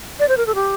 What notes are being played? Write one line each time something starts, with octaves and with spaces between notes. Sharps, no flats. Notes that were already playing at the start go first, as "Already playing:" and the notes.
D5
C5
A#4
A4
G4